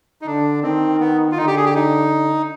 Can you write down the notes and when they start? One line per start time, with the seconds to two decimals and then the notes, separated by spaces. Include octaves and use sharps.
0.22 D#4
0.26 D3 D4
0.63 D#3 C4
1.00 B3
1.32 F4
1.37 D3 D#4
1.47 G4
1.57 G#4
1.66 G4
1.75 D#4